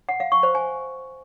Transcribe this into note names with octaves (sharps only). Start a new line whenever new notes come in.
F#5
F5
C#6
C5
G#5